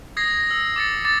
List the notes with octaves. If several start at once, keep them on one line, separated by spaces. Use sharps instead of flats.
D#6 G#6 A#6 C7
E6
D6 A6 C#7
D6 A6